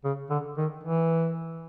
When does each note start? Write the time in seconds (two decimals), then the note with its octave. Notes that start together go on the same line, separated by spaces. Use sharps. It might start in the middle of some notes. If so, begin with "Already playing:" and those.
0.04 C#3
0.30 D3
0.57 D#3
0.83 E3